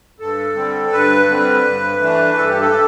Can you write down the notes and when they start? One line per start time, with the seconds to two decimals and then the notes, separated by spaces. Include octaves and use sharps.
0.19 G2 A4
0.56 D3 G3 C4
0.92 G2 B4
1.29 D3 G3 C4
1.65 G2
2.01 E3 A3 D4
2.37 G2 A4
2.49 G4
2.61 A4